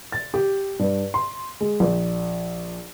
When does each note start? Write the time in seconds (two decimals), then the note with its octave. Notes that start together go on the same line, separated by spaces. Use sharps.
0.12 A6
0.34 G4
0.79 G2
1.14 C6
1.61 G#3
1.80 A#1